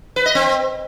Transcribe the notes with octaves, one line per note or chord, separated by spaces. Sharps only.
B4
D#5
C4